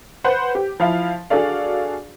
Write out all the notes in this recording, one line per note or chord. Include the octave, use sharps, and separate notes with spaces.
B4 C5 F#5
G4
F3 E4 F5
D4 F#4 G#4 A4 D5 F5